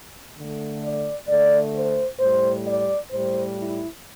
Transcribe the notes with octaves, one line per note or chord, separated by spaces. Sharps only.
D3 A3
D5
D3 A3 D5
C5
A2 G3 C5
D5
A2 G3 C5
E4